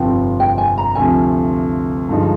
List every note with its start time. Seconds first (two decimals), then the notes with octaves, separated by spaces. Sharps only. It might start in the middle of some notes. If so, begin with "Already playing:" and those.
Already playing: G1 F2 C3 F3 G5
0.40 G5
0.58 G#5
0.78 A#5
0.95 D2 C3 F3 G#5
2.09 G2 D3 F3 G#3 D#4